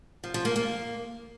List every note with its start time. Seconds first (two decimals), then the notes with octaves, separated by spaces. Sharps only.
0.24 F3
0.34 F3
0.45 A#3
0.56 A#3